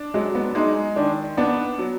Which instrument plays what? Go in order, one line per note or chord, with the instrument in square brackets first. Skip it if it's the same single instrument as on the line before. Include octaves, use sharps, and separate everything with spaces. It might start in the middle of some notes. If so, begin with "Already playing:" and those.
Already playing: [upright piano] D4
[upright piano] F#3 [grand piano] G#3
[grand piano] B3
[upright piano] G#3 [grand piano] D#4
[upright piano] D#3 [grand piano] D4
[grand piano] B3 [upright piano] D4
[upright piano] F#3